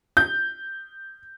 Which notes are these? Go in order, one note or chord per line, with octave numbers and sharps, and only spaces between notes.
G6